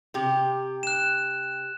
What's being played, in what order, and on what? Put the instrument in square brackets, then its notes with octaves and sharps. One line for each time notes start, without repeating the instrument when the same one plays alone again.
[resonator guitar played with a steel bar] C3 G4
[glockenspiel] F#6 E7